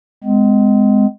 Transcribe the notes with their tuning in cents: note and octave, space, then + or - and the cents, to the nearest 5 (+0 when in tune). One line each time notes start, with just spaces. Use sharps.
G#3 +0 C4 -45